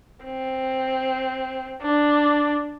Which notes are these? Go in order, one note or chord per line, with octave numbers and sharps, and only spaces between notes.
C4
D4